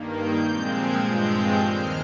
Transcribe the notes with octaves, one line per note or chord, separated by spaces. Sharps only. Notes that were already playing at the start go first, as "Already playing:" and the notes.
Already playing: G2 D#3 A#3
G6
A#2 F3 G#3 C4
G#6
G2 F3 G#3 C4 G6
G6
D#2 D#3 G#3 F6